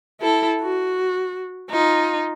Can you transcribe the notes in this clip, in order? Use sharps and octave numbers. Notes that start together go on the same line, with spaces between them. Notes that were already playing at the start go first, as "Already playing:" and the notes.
E4 A4
F#4
D#4 F4